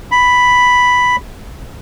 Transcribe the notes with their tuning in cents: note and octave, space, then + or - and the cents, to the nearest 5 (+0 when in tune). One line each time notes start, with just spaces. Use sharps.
B5 +0